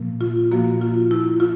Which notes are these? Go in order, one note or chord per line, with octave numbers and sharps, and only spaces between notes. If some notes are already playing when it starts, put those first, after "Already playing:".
Already playing: A#2 F3 A#3
F4
A#2 F3 A#3 F#4
F4
E4
F4